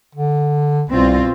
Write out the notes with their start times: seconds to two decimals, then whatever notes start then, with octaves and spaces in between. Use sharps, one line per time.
0.15 D3
0.90 C2 B2 C4 F4